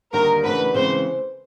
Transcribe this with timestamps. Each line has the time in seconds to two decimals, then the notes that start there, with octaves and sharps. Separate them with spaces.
0.13 D#2 D3 G3 A#3 D#4 A#4
0.44 C#3 E3 A3 D4 F#4 B4
0.74 C#3 E3 G#3 C4 C5